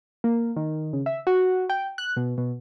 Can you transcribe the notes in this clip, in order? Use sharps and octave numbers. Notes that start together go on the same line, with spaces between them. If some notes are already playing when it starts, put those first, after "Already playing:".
A#3
D#3
C#3
E5
F#4
G5
F#6
B2
B2